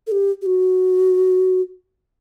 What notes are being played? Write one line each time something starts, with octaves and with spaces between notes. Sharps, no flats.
A4
G4
G4
F#4